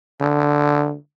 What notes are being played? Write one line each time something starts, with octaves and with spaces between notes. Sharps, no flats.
D3